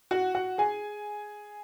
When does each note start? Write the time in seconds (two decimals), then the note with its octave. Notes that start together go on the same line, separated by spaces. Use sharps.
0.11 F#4 F#5
0.35 F#4 F#5
0.58 G#4 G#5